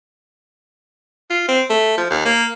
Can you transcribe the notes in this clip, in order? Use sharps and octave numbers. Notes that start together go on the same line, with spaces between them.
F4
C4
A3
F3
D#2
A#3